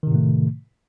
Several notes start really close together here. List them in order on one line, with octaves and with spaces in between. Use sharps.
D#3 C3 A2 A3